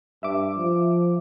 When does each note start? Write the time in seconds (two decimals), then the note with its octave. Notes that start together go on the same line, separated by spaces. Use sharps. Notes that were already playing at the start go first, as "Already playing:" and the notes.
0.23 G2 E5 D6
0.57 F3